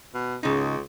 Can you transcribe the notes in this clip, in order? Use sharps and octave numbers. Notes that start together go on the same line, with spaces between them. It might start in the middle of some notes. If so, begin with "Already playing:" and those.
B2
C#2 C#3 D#4